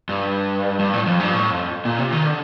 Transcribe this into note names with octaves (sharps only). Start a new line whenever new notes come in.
G2
G2
A2
F2
G2
A2
F2
A#2
C3
D#3
D3